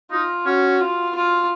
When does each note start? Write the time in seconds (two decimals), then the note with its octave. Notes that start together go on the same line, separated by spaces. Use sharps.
0.11 D#4 F4
0.46 C#4 F#4
0.81 F4
1.15 F4